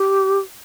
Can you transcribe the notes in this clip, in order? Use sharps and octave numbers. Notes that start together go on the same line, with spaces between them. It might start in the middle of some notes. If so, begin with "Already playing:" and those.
Already playing: G4